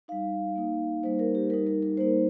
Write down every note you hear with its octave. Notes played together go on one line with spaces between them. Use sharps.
G3 D#4 F5
A#3 D#4
G3 A#3 D#4 C5
A#4
G4
G3 D#4 A#4
A#4
A#4
G3 A#3 D#4 C5